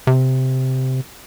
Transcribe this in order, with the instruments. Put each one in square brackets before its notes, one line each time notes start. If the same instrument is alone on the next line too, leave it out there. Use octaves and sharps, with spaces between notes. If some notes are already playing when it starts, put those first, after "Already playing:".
[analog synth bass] C3